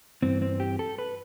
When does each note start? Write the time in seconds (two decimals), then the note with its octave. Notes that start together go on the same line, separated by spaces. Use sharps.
0.23 G2 E3 C4
0.42 C4
0.60 G4
0.79 A4
0.98 B4